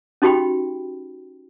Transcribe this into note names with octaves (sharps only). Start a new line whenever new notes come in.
C#4 D#4 F#4 G4 G5 B5